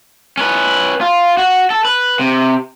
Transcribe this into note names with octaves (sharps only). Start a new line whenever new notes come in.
C#4 B4
F4
F#4
A4
B4
C3